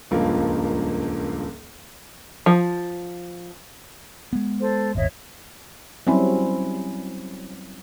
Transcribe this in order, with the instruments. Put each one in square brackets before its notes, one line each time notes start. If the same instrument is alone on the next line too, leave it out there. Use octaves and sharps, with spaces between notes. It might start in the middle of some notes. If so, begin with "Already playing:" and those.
[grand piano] D#1 C#2 G2 F3 A#3
[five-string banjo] F3
[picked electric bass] G#3 B3
[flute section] A4 C5
[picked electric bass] D1 G1 D#2 [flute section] C#5 D#5 E5
[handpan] F#3 G3 C4 C#4 E4